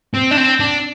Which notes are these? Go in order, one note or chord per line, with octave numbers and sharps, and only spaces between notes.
C4
D4
C4
D4